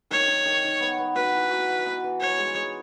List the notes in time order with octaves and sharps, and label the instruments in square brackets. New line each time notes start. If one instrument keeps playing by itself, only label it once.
[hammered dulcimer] D#3 [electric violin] C#5
[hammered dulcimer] D#3
D#3
D#3
B3
B3
[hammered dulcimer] F#4 [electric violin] B4
[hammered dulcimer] E3
F#4
B3
B3
E3
[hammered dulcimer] B3 [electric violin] C#5
[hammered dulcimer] G#3
G#3